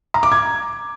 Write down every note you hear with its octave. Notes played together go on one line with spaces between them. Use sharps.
A#5
D6
G#6